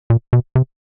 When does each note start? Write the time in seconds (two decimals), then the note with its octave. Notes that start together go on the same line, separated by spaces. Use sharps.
0.10 A#2
0.33 B2
0.55 C3